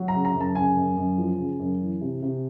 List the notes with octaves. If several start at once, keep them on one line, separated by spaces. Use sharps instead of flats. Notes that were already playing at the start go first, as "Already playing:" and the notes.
Already playing: F#3
A#5
C#3
A#5
F#2
A5
C#3 G#5
F#2
F#2
F3
C#3
F#2
E3
C3
C3